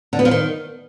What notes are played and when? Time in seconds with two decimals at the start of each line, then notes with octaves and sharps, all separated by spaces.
0.13 D3
0.19 B3
0.25 F3
0.31 D#3